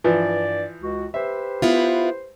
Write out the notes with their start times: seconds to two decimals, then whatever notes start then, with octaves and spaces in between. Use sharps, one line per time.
0.04 G2 E3 F3 D5
0.80 C#2 F#4
1.14 G4 B4 C5 E5
1.62 B3 E4 F4